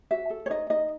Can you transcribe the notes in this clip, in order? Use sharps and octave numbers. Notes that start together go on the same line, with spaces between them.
F#4 E5
A4
C#5
D#4 D#5
D#4 D#5